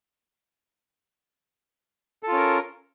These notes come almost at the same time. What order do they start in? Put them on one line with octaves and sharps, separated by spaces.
A4 F4 C#4 A#4